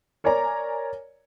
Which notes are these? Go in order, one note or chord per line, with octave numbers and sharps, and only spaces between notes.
A#4 C#5 D5 G#5 A#5